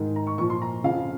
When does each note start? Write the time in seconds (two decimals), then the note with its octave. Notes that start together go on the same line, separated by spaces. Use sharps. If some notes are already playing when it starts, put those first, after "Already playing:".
Already playing: G#2 D#3
0.16 A#5
0.27 C#6
0.38 A#2 F3 C#6
0.50 C6
0.62 A#5
0.84 F2 C#3 F3 F5